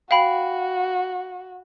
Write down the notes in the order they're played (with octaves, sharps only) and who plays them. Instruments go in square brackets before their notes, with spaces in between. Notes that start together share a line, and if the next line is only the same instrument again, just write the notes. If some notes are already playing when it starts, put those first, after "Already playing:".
[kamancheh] F#4 [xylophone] F5 G5 B5